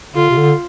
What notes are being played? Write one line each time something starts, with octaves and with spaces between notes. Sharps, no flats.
D3 F4
C3
D3